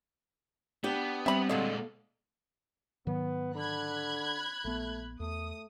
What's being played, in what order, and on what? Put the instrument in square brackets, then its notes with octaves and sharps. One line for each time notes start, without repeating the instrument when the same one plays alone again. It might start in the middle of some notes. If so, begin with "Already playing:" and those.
[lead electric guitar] B3 [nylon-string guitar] D4 G4
[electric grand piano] G3 C4 [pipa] E5 B5
[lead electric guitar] A#2 G#3 [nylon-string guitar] D3 [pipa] F#3 F4 D#5
[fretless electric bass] G#2 D#3 F#3 [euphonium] B3
[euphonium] D3 [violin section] B5 F#6 G#6
[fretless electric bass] A#1 B3 [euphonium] A3
[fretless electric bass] E2 [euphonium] A3 [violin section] D#6